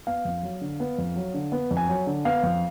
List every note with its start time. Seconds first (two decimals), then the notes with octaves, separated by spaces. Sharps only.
0.07 B3 F5
0.25 F2
0.43 F#3
0.61 D3
0.80 B3
0.98 F2
1.16 F#3
1.34 D3
1.52 B3
1.71 F2
1.77 G#5
1.88 F#3
2.07 D3
2.25 B3 F5
2.43 F2